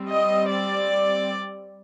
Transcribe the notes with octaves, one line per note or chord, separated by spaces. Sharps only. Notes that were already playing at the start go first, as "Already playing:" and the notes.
Already playing: G3 C4
D#5
D5